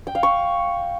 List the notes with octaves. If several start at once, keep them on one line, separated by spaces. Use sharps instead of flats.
G5
F5
C#6